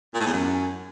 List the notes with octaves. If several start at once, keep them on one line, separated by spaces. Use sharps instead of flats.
A#2
A2
E2
F#2